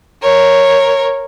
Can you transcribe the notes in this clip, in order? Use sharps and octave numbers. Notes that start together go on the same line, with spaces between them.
A#4 C#5